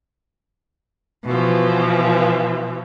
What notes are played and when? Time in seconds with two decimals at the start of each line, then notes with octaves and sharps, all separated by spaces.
1.25 B2 E3 F3